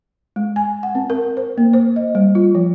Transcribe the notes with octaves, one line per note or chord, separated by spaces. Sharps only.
G#3
G#5
F#5
C4
A#4
C5
A#3
C5
D#5
G3
F4
F3